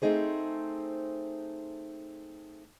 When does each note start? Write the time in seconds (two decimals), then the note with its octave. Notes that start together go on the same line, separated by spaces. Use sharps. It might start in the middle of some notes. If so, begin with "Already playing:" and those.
0.02 A3 C4 D#4 G#4 C5